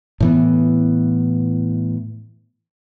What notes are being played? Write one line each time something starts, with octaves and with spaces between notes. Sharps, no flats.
A2 E3 B3